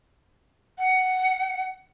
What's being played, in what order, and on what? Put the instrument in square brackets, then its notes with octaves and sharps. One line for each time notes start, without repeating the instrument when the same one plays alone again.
[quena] F#5